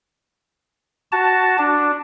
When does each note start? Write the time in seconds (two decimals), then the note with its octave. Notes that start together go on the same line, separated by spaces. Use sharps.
1.12 F#4 A5
1.58 D4